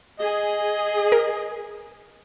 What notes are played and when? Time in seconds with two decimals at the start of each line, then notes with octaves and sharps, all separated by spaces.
0.19 G#4 D#5
1.12 A#4